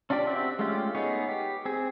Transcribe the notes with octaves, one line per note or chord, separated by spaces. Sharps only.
C#4 D4 F4 G4 D5
C4 F#4 G4 E5
G#3 A3 C#4 F4 G4
B3 D#4 G#4 C#5
G4
C4 G#4